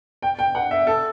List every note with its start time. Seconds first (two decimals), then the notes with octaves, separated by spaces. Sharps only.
0.22 G5
0.39 G5
0.55 F#5
0.71 E5
0.87 A4